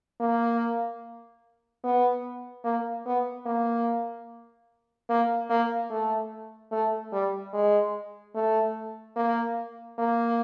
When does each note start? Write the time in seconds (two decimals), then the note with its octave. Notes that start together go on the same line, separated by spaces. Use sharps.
0.20 A#3
1.84 B3
2.64 A#3
3.05 B3
3.46 A#3
5.09 A#3
5.50 A#3
5.90 A3
6.72 A3
7.12 G3
7.53 G#3
8.35 A3
9.16 A#3
9.98 A#3